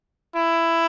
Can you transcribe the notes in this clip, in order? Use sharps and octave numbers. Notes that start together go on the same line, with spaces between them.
E4